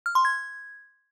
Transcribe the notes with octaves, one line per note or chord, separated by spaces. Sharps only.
F6
C6
G#6